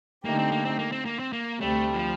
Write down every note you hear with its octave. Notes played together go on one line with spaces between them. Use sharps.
D3 A3 A#3 D#4 G4
C4
A#3
C4
A#3
C4
A#3
C4
A#3
D2 C3 G3 A3
F3